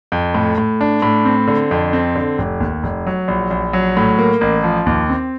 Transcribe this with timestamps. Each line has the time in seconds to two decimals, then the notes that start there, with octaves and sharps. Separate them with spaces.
0.12 F2
0.35 A2
0.58 A2
0.81 D4
1.02 A2
1.25 C4
1.48 D3
1.71 F2
1.93 C4
2.15 D3
2.38 F1
2.60 D#2
2.83 F1
3.07 F#3
3.28 A#1
3.50 A#1
3.73 F#3
3.97 A2
4.19 A#3
4.41 A1
4.63 F3
4.86 D#2
5.10 C4